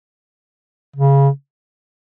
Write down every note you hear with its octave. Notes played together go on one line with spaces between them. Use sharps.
C#3